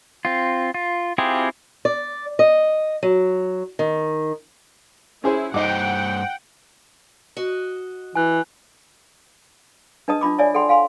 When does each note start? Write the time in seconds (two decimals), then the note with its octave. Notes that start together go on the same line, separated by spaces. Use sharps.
0.25 C4 F4
0.74 F4
1.18 C4 E4 F4 G4 G#4
1.85 D5
2.39 D#5
3.03 F#3
3.79 D#3
5.24 C#4 E4 G#4 C5
5.54 G2 D#4 C5 F#5 G5 D6
7.37 F#4 D#5
8.15 E3 G#5 F#6
10.08 D4 B4 D#5 A5 D#6
10.21 D4 F4 B5 D6
10.38 C#5 D5 E5 G#5
10.55 A4 F#5 G5 C6
10.69 F5 G#5 C6